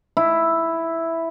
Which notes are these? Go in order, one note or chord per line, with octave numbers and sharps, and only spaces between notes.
E4